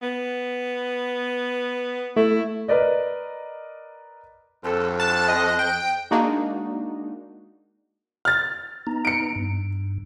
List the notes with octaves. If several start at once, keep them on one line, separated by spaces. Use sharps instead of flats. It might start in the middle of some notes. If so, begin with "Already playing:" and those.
B3
A3 E4
A#4 B4 D5 D#5
F2 A4
A5 F#6
D#5
G5
G#3 A#3 D4 D#4 F#4
F6 A6
B3 D#4 A#5
C#7 D7
G2